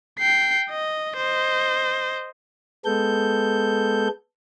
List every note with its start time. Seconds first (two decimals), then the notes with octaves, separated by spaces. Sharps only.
0.19 G5 C7
0.70 D#5
1.17 C5 D#5
2.85 G#3 B3 A4 G6